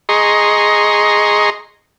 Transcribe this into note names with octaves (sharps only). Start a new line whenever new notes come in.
G#4 D#5 A#5 C6 C#6